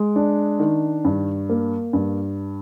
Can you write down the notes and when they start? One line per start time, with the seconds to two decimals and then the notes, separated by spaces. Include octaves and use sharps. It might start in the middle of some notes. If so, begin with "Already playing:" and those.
Already playing: G#3
0.16 D4
0.60 D#3
1.05 G2
1.49 A#3
1.93 G2